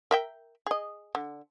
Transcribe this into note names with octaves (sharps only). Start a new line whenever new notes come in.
A#4 E5 G5
G#4 D#5
D3